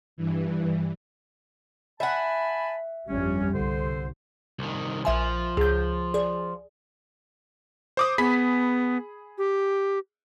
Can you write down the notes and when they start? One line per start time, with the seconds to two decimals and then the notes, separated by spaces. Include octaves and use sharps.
0.17 G2 E3
2.00 E5 F#5 G#5 A5 B5
3.09 G1 F2 G3 C#4
3.54 C2 D3 C5
4.59 C2 D#3
5.05 A#1 F3 E5 G#5
5.57 C#2 G#4 G6
6.14 G#4 D5
7.97 C5 D6 D#6
8.18 B3 G#4 B5 B6
9.38 G4